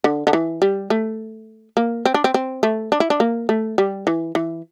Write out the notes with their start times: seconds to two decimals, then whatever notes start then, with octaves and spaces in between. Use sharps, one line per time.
0.04 D3
0.27 D3
0.33 E3
0.62 G3
0.90 A3
1.77 A#3
2.05 C4
2.14 D4
2.24 C4
2.34 C4
2.63 A3
2.92 D4
3.00 E4
3.10 D4
3.20 A#3
3.49 A3
3.78 G3
4.07 E3
4.35 E3